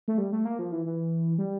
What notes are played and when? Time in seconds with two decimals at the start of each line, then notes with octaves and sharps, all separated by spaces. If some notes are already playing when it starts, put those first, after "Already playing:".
0.08 A3
0.18 G3
0.32 A3
0.45 A#3
0.59 F3
0.72 E3
0.86 E3
1.38 G3